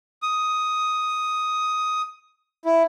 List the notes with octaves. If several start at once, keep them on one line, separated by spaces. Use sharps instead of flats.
D#6
E4